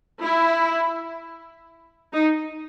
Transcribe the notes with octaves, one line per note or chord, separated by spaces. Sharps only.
E4
D#4